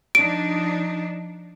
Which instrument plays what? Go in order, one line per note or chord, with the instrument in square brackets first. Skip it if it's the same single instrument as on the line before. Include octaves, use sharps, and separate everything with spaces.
[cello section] F3 D4 D#4 [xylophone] D7